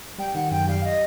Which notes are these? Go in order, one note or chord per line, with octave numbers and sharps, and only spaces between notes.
G3 G5
D#3 F#5
F#2 G5
G3 F5
D#5